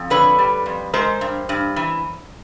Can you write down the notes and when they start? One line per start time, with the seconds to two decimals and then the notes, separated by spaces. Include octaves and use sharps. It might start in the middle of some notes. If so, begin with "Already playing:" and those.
Already playing: F2
0.10 D3 B4 C#5
0.39 G3
0.66 F2
0.94 G#3 A#4 C5
1.21 G2
1.49 G2
1.76 E3